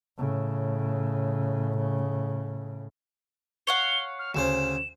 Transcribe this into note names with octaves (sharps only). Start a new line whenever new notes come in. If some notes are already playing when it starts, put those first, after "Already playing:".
A2 C#3
C#5 F5 F#5 G7
F6
D2 C#3 C5 E7